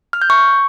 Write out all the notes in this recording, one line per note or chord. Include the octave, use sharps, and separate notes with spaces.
F6
G6
C#6